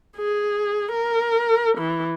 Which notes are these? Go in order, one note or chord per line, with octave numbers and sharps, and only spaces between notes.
G#4
A#4
E3